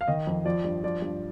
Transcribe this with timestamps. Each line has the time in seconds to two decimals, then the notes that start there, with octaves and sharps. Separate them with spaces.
0.01 F5
0.08 D#3 D#5
0.27 F2
0.45 F3 D5
0.64 G2
0.84 F3 D5
1.02 G2